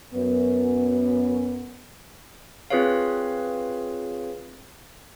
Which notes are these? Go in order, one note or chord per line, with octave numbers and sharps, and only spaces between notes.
F#2 B3
C4 F4 G#4 B4 C#5 F5